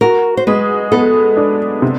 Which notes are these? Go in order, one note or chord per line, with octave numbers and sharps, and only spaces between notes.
F#4 A#4
C5
G#3 B4
B3 A4
D4
C3